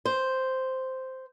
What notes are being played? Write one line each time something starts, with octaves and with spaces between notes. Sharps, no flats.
C5